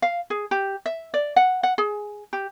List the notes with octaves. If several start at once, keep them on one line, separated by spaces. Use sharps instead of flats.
F5
G#4
G4
E5
D5
F#5
F#5
G#4
G4